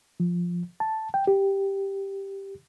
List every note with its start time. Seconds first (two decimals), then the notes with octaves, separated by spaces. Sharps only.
0.20 F3
0.80 A5
1.14 G5
1.27 G4